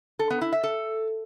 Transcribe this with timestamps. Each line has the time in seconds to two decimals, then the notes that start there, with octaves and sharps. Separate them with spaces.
0.19 A4
0.30 B3
0.41 E4
0.52 E5
0.63 A4